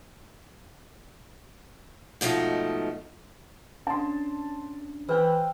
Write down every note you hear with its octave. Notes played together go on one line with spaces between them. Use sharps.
G#2 B2 F3 A3 D#4
C#4 D4 A5 C6
E3 B4 C5 F5 G5 E6